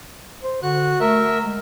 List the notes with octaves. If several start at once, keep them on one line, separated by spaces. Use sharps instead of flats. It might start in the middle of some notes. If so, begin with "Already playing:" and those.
C5
D3 F#4 F#6
A3 A#4 E5
G#3